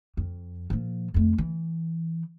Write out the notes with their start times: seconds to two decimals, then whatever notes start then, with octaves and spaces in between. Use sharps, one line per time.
0.17 F2
0.70 A#2 F3
1.14 F2 A3
1.38 E3